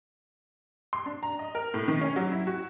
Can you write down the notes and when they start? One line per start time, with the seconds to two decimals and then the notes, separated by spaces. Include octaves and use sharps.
0.93 C6
1.06 D4
1.23 A#5
1.39 D#5
1.55 A#4
1.74 A2
1.88 D#3
2.01 C#4
2.16 F#3
2.32 E4
2.47 F#4